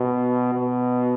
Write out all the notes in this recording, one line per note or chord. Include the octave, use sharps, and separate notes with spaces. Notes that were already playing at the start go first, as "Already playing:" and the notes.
Already playing: B2
B2